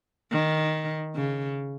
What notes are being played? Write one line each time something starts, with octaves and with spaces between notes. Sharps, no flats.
D#3
C#3